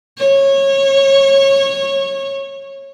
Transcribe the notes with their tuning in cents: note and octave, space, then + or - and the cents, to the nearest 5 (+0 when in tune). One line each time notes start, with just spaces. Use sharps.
C#5 -20